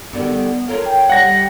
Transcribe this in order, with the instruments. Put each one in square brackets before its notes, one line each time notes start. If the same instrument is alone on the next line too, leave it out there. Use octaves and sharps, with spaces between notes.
[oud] D3 D#3 G3 [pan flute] B3
[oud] F4 A4 A#4 [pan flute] C#5
[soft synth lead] G5
[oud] G3 [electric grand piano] F#5 A#6